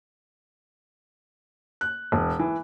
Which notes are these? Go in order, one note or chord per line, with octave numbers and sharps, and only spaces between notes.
F#6
E1
E3